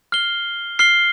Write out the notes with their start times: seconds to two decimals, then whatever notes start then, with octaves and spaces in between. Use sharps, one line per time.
0.12 F6 C7 G7
0.79 F6 C7 G7